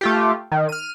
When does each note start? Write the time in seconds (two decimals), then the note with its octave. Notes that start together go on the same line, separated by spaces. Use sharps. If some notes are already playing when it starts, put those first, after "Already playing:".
0.01 A3 F4 G4
0.52 D#3
0.69 F6 D#7